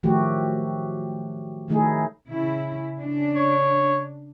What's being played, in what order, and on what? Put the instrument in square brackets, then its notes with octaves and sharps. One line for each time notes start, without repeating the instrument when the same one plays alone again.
[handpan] D#3 F3 F#3 A3 F#4 G4
D#3 F#3 A3 D#4 E4 G#4
[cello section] C#3 E4
C#3 D4
[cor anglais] C#5